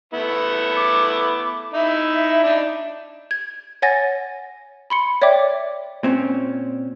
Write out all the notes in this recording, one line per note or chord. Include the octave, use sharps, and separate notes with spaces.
A3 B3 E4
D6
D#4 E4 E5
D4 D#4
G#6
C#5 F#5 G#5 A6 A#6
B5 C6 C#7
C#5 D5 E5 G5 D6
A#2 C4 C#4